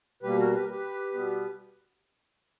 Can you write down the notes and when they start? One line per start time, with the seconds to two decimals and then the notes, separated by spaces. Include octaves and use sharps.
0.23 B2 G3 A#3 G4 B4
0.38 F#4 A#4
0.53 G4 B4
0.62 A#4
0.68 G4 B4
1.14 B2 G3 B3